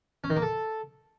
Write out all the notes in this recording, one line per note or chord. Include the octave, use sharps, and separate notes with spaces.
C#4
D#3
A#3
A4